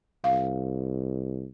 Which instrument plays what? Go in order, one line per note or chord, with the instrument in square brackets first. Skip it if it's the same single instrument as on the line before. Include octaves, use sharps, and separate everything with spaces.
[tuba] C2 [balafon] F5